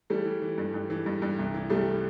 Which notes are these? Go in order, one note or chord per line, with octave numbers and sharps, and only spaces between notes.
E3 G3 A3
E3
E3
G2
G2
E3
G2
G2
C2
E3
C2 G3 A3